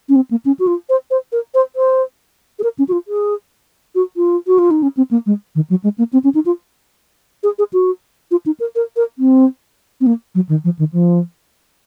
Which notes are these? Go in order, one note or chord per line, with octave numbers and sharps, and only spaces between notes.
C#4
C4
A#3
C#4
F#4
F4
C5
C5
A#4
C5
C5
G#4
A#4
C#4
F#4
F4
G#4
F#4
F4
F#4
F4
D#4
C#4
C4
A#3
G#3
D#3
F#3
G#3
A#3
C4
C#4
D#4
F4
G#4
G#4
F#4
F4
D#4
A#4
A#4
A#4
C4
C4
A#3
F#3
D#3
F3
D#3
F3